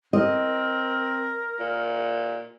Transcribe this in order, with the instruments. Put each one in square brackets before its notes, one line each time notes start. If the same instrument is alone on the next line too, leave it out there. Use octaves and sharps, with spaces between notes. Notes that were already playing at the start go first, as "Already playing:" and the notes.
[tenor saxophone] C4 [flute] A#4 [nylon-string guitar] D#5
[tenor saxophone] A#2